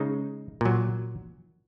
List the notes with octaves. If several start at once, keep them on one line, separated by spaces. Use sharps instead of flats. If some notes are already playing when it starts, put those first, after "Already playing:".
Already playing: C#3 G#3 D#4
A#2 F#3